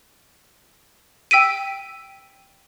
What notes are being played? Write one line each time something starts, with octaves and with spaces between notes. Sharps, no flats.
G5 E6 B6 D7 D#7